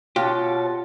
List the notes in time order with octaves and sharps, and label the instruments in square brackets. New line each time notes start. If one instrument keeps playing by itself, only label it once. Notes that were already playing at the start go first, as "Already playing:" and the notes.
[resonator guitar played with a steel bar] B2 [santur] F4 [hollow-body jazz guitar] G4 [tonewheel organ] C#5 A5